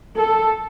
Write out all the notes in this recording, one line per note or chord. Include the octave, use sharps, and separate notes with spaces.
A4